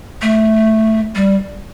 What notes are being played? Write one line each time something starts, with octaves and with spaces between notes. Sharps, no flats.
A3
G3